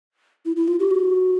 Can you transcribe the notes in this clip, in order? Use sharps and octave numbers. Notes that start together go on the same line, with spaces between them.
E4
E4
F4
G4
F#4